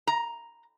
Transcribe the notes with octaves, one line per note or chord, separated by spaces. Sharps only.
A#5